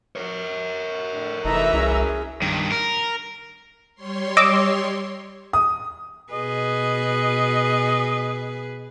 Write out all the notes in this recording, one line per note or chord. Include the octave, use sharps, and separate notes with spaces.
A#4 C#5
A2 D3
F1 E3 D#4 A4 D#5 E5 A#5
C2 C#4 G#4
G2 D#3
A#4
G3 C#5 C6
D#5 D6 E6
D#6
B2 G#4 B4 D#5